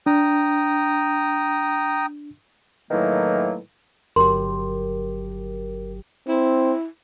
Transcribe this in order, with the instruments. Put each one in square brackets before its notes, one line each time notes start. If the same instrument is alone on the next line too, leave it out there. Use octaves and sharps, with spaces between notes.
[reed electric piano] D4 [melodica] G5 A#5 D#6
[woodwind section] A2 D#3 E3 F#3 A3 A#3
[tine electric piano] G1 F#3 G4 [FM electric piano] A#4 [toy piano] C6
[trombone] C4 [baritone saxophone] E4